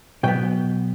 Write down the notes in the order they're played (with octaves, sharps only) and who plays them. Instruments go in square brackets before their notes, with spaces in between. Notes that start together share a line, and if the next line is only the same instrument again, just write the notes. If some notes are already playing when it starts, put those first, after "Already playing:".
[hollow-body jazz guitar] B2 F#3 B3 G5